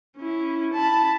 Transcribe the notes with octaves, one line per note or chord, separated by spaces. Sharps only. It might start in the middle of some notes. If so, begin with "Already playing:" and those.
C#4 E4
A5 B5